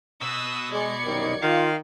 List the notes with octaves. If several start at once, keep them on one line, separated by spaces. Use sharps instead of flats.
B2 D#6 E6 F#6
G#3 D5 G#6 C#7
C2 F#2 D#3
D#3 F4 F5